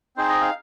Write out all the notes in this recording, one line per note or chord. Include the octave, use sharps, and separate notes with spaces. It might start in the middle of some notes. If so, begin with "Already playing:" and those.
C4 D#4 G#4 C5
D#5
F5